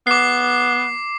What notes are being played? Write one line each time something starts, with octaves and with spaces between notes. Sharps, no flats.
B3 D6 C7